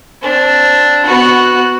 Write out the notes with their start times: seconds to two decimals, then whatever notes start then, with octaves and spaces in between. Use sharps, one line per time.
0.22 C4 D4
1.06 B3 F#4